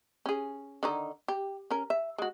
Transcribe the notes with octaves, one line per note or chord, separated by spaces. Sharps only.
C#4 G#4
D3 D#3 D#4
G4
C#4 A#4
E5
G#3 F#4